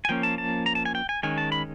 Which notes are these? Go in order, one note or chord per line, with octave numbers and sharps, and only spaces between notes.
G#5
F3 A#3 C#4 G5
A5
A5
A#5
A5
G#5
G5
G#5
D#3 G#3 C#4 G#5
A5
B5